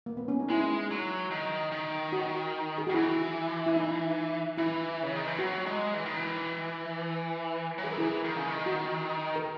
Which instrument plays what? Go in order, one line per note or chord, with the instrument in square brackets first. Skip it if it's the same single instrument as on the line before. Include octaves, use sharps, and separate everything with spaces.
[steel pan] A#3
B3
C#4
D#4
[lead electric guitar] G#3 [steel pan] E4
[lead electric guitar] F#3
D#3
D#3
[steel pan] F#4
G#4
[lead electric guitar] D#3 [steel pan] F#4
[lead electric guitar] E3 [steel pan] E4
[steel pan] E4
D#4
[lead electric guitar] E3 [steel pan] E4
[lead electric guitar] C#3
D#3
E3
[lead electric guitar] F#3 [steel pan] F#4
[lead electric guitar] G#3
E3
D#3
E3
F#3
[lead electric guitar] E3 [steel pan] G#4
[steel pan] A#4
E4 G#4
[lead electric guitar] D#3
C#3
D#3
[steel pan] F#4
A#4